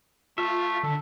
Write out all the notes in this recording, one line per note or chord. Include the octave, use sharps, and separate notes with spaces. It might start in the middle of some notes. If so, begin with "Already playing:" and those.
A3 F4 E5
D3 A4